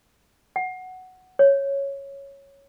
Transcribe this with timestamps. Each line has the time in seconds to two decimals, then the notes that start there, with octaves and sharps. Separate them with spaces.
0.56 F#5
1.39 C#5